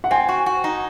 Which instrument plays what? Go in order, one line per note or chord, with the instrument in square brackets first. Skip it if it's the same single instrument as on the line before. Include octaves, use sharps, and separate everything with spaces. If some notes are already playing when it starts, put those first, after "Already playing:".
[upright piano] F#5
[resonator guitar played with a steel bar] C4 [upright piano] G#5
[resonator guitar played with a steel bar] F#4
F#4
D#4